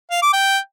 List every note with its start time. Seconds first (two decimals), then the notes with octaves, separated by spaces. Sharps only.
0.11 F5
0.22 D6
0.33 G5